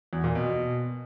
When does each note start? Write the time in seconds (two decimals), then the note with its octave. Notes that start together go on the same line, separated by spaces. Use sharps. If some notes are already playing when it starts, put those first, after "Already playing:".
0.13 E2
0.24 A#2
0.35 B2